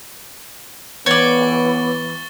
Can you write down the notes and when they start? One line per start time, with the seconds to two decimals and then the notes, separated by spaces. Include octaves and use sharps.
1.06 E3 B3 C#5 D5 C#6 A6 G7